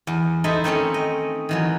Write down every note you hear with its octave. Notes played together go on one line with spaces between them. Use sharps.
E2
D#4 E4 A4 C5 D#5 E5
D#3 A3 C4 C#4
D#5
D#3 E3 F#3